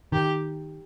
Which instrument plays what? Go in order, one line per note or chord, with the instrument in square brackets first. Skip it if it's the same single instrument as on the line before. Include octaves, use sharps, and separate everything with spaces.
[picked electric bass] D#3 [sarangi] G4